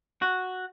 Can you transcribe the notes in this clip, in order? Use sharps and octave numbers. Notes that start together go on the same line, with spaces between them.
F#4